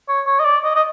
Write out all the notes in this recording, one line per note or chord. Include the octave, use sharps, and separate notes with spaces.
C#5
C#5
D#5
D5
D#5
D#5